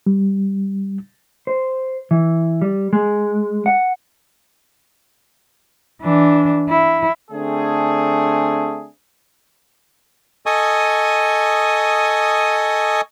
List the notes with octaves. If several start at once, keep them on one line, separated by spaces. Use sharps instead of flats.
G3
C5
E3
G3
G#3
F#5
E3 D4
E4
D3 A3 C4 D4 G#4
A4 D#5 G#5 C#6 D#6